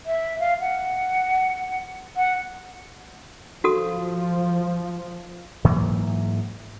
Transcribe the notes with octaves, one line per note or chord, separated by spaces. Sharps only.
E5
F5
F#5
F#5
F3 F#4 A4 D#6
G#2 E3 F#3 A#3